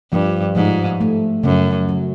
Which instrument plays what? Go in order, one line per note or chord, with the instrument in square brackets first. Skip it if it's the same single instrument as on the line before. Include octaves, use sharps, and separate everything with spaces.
[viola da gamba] G2 [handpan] F3
[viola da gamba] G#2 [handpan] F3
[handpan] A3
[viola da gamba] F#2 [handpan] C#3
[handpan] F#3